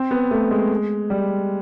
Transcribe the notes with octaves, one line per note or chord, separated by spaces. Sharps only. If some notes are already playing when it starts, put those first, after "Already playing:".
Already playing: C4
B3
A3
G#3
G3